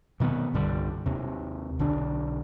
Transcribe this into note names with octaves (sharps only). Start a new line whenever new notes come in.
B2 D#3 A#3 B3
C2 G2 D3 G3
D#2 C3
B1 D3 D4